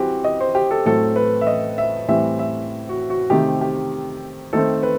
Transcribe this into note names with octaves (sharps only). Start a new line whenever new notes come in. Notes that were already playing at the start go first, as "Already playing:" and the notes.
Already playing: E3 G3 C4 F#4 G4
D#5
C5
G4
A4
A2 F#3 C4 A4
B4
E5
D#5
E5
A2 E3 G3 C4 E5
E5
F#4
F#4
C3 D#3 A3 C4 G4
G4
D#3 A3 C4 A4
B4